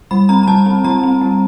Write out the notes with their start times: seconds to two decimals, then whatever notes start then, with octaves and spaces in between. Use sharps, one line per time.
0.11 G3 B5
0.29 C4 A#5
0.43 A#5
0.47 G3 A5
0.66 C4
0.84 G3 A#5
1.04 C4
1.21 G3